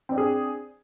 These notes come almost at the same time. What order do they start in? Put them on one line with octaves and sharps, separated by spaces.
C4 D5 D4 G#4